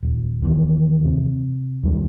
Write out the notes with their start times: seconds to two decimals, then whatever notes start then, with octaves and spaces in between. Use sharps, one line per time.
0.03 D#1
0.42 D#2 E3
1.05 C3
1.83 D#2 G3 D4